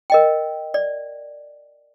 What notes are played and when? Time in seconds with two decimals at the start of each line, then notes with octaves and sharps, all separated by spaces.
0.10 A#4 D#5 G5
0.74 D5